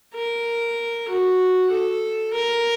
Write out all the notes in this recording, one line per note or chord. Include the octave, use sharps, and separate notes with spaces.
A#4
F#4
A4
A#4